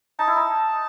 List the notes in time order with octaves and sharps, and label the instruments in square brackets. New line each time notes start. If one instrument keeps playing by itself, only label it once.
[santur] D#4 [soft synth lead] A5
[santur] E4
D#4